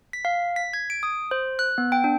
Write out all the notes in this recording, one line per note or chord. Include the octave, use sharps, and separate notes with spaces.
B6
F5
B6
G#6
D7
D#6
C5
F#6
B3
G5
D4